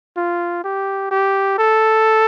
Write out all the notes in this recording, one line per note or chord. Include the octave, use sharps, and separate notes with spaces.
F4
G4
G4
A4